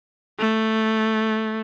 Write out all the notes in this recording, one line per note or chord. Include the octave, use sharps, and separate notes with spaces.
A3